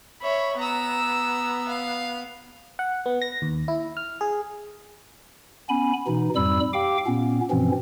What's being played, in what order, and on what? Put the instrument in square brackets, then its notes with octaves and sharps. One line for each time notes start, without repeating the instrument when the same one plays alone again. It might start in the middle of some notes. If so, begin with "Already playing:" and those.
[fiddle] C#5 E5 [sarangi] B5
[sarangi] B3 [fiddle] A#5 E6
[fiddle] F5
[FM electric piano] F#5
B3
A#6
D#2
E4
F6
G#4
[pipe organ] B3 C#4 G#5 B5
B2 E3 D#4
F2 G#2 G3 B5 E6
G4 F5 G5 D6
A#2 B3 C#4
G2 B2 E3 F3 C4 C#4